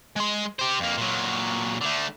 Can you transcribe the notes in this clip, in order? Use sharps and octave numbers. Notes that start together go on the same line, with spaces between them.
G#3 C6
G4 C5
F2 A#3
A#2 F#3
D3 A3